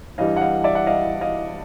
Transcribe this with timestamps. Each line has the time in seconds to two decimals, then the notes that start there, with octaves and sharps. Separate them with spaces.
0.18 G2 E3 G3 D#5 F5
0.36 F#5
0.40 D#5 F5
0.64 D5 E5
0.75 F#5
0.86 D#5 F5
1.21 D#5 F5